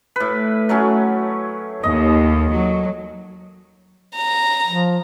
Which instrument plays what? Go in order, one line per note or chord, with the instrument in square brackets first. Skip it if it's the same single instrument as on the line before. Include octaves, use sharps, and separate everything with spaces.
[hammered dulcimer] A2 B4
F#3 A3 C#4
[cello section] D#2 [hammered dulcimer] D#5
[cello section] F#3
[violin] A#5
[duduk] F3